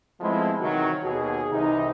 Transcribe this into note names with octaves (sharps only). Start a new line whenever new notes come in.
F3 G#3 A3 B3 C4 E4
C3 D#3 E3 F#3
D#2 B2 F#4 G#4
C2 C3 D#3 E3 D#4